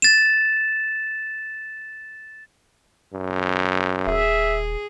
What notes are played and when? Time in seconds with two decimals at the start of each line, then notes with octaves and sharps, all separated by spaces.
0.02 A6 E7
3.14 F#2
4.06 D#1 G#4 E5